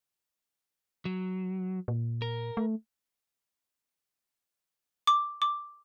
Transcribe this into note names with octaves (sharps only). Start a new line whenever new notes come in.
F#3
A#2
A#4
A3
D6
D6